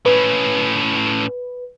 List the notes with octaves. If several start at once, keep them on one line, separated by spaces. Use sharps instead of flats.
A2 C#4 B4